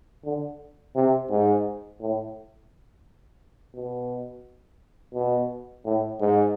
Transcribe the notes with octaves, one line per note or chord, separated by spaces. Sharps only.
D3
C3
G#2
A2
B2
B2
A2
G#2